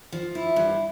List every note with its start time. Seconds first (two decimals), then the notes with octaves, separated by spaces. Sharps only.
0.12 F3
0.35 E4
0.56 G2